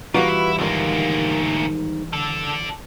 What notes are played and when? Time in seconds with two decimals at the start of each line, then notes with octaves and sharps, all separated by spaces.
0.14 E3 G3 A#3 F4 F#4 B4
0.29 E4
0.58 D2 G#2 D#3 A#3
2.13 D4 A4